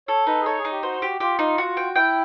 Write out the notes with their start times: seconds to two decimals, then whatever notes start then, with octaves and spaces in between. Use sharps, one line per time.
0.08 A4 C#5
0.27 D#4 B4
0.41 G#4
0.46 A4 C#5
0.59 G#4
0.65 D#4
0.71 G4
0.83 F#4 C5
1.02 G4
1.20 F4 G4
1.39 D#4
1.58 F#4
1.77 G5
1.96 E4 G5